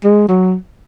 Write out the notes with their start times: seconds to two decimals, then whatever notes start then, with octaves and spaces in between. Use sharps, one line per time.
0.04 G#3
0.28 F#3